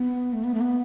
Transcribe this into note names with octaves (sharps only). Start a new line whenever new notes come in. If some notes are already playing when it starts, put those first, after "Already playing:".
Already playing: B3
A3
B3
A3
B3